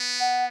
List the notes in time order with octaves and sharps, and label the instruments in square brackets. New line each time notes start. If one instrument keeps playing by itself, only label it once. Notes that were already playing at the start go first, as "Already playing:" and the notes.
Already playing: [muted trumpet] B3
[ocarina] F#5